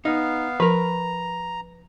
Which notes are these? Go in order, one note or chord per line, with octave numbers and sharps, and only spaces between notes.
B3 D#4 F5
F3 A#4 B4 A#5